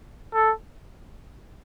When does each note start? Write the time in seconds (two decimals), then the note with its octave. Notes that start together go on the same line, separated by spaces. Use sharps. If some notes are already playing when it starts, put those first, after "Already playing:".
0.34 A4